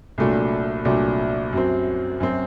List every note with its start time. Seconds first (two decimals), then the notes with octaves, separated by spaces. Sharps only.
0.18 C2 A#2 F#3 A3 D4
0.85 C2 A#2 F#3 A3 D4
1.53 F#2 F#3 C4
2.20 F#2 F#3 C4